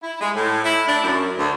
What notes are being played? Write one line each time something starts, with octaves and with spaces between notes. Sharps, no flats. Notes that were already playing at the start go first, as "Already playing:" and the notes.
E4
G#3
A2
E4
D4
F#2
D2